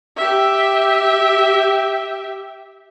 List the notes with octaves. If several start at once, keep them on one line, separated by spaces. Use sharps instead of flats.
G4 E5